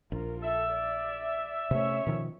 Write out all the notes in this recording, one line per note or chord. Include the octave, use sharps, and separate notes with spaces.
A#1 F4 A#4
A4 E5
D5
C3 A3 C#4 C#5
B2 D#3 F3